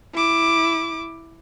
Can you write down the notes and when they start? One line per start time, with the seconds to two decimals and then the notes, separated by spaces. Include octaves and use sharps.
0.14 E4 D6